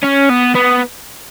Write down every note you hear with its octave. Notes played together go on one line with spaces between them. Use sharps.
C#4
B3
B3